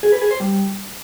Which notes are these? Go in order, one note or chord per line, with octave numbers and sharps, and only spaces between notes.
G#4
B4
G#4
C5
G3